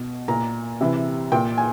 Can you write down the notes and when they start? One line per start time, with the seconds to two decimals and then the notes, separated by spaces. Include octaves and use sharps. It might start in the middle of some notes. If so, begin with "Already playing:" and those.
Already playing: B2
0.28 A#2 A#5
0.81 C3 E3
1.32 A#2 G5
1.58 G#5